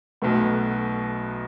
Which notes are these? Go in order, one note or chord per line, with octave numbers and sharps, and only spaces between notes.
B1 B2 A3 B3